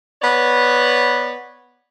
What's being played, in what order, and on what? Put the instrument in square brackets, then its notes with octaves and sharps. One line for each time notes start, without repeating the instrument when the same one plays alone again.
[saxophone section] B3 B4 C#5 D5